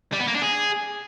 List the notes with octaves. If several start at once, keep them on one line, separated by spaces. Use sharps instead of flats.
G3
B3
A#3
D4
G#4